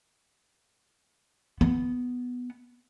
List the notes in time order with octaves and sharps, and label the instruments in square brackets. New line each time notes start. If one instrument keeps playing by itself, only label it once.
[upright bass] B3